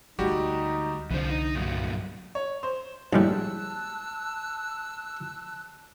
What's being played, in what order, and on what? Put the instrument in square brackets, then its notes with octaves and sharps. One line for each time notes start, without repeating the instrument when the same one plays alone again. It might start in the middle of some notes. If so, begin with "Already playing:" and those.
[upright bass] D2 G#3 [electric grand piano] G3 F#4 G4 [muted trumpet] D#4
[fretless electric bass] C2 D3 [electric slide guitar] E3 F3 C5
[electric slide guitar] D#4
G2 A#2 F#3
[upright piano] C#5
C5
[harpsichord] A#1 A2 [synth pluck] G3 G#3 [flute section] A5 E6 F#6